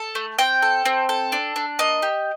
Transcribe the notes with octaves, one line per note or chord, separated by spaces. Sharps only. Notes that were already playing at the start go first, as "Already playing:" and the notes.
Already playing: A4 A5
A3
C4 G5
A4
C4
A4
D4
D4
A#3 D#5
G4